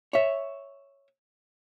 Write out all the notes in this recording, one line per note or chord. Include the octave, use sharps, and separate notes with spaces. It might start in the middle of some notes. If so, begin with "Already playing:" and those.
C#5 E5